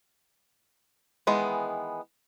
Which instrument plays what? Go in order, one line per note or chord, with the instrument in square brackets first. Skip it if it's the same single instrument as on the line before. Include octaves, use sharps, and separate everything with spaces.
[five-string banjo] D#3 E3 G#3 B3